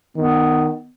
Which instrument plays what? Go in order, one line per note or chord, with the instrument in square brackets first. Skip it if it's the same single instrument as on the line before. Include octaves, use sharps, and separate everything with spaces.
[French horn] D#3 [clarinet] B3